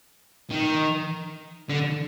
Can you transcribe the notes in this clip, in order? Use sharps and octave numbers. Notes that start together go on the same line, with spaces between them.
D#3
D3